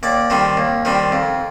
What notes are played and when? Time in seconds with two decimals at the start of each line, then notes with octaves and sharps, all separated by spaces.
0.03 D#2 D5
0.30 D#3 G3 C4
0.57 D#2
0.85 D#3 G3 C4
1.12 F2